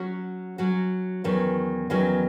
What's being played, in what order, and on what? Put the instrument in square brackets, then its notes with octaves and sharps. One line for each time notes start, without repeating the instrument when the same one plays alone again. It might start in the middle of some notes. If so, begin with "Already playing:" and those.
Already playing: [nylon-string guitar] F#3 C#4 F#4
F#3 C#4 F#4
E2 D#3 F#3 C#4
E2 D#3 F#3 C#4